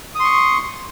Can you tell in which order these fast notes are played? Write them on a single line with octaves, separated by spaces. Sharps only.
D#6 C6 C#6